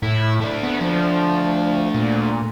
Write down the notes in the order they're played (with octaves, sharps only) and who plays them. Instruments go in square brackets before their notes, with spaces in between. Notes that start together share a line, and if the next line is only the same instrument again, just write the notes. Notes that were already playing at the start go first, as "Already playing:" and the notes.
[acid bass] A2 [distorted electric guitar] E4
[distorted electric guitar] A3 D4
[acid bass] B3
F3
A#2